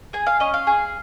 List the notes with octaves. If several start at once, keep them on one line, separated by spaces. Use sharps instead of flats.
G#4 G#5
F5
C#4 D#5
F5
G#4